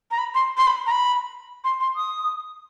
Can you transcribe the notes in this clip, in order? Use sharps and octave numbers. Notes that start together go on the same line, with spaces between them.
A#5
B5
C6
C6
B5
A#5
B5
C6
C6
D#6